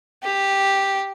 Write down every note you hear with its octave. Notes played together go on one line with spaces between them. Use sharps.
G4